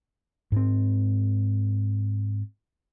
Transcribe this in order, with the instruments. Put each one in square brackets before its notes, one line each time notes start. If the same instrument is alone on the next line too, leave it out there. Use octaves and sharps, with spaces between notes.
[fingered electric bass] G#2 C4